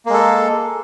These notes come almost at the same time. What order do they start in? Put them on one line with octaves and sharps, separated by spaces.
A#3 G#3 A4